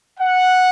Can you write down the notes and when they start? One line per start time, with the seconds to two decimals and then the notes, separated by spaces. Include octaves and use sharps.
0.20 F#5